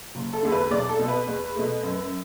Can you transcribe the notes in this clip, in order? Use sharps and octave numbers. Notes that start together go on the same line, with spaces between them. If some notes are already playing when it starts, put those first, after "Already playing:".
F#1
A4
E2 D3
B4
B1 D5
A4
B2 B3
B4
E2
B2 A3
F#2